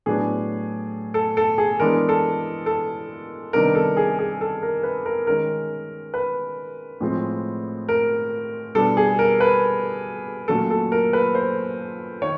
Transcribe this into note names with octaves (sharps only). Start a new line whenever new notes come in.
A2 F#3 B3 D4 G#4
A4
A4
G#4
E3 G#3 B3 D4 A#4
A4
A4
C3 D#3 G3 B3 D4 A#4
A4
G#4
G#4
A4
A#4
B4
A#4
D#3 G#3 C#4 A#4
B4
A2 F3 G#3 C4
A#4
B2 G3 B3 D4 A4
G#4
A#4
B4
A#2 F#3 A3 C#4 A4
A4
A#4
B4
C5
D#3 C#5